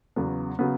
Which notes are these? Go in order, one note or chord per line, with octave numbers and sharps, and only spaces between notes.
E2 C#3 F#3 B3
C#3 F#3 B3